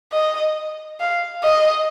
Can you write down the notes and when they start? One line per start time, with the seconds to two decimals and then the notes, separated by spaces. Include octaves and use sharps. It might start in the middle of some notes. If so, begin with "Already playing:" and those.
0.13 D#5
1.01 F5
1.44 D#5